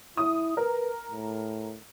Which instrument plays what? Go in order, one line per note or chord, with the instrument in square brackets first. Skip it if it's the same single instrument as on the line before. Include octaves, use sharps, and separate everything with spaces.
[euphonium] E4 [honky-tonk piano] D#6
[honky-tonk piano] A#4 [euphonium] B4
[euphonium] A2